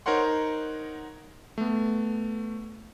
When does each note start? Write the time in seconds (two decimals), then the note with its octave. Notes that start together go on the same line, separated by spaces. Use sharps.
0.06 D#4 A#4 C5 C#5 F#5 C6
1.58 A3 B3